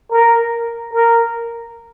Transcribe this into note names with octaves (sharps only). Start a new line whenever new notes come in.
A#4
A#4